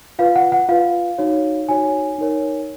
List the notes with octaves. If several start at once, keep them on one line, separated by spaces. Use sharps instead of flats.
F4 B4 F5
F#5
F#5
F4 B4 F5
D#4 F#4 C#5
D#4 F#4 C#5 G#5
D#4 A#4 C#5